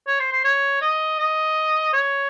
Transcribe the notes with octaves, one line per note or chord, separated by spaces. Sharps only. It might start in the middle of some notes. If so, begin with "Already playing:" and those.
C#5
C5
C5
C#5
D#5
D#5
C#5